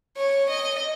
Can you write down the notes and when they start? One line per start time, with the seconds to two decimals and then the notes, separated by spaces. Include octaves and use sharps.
0.17 C#5
0.50 D#5